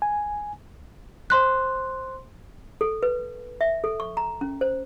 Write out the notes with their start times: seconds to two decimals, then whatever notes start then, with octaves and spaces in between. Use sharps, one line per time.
0.02 G#5
1.30 C5 C6 F#6
2.81 A4
3.03 B4
3.61 E5
3.84 A4
4.00 C#6
4.17 A#5
4.41 C#4
4.61 C5